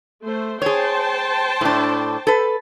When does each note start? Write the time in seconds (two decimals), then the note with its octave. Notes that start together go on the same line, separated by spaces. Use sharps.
0.23 A3 C5
0.62 G#4 C5 C#5 G5 A5
1.61 A2 D4
2.27 A4 B4